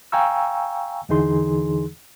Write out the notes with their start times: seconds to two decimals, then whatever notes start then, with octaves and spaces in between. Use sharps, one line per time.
0.12 F5 G5 G#5 A#5 C#6 E6
1.09 E2 D3 E3 D#4 G#4 C6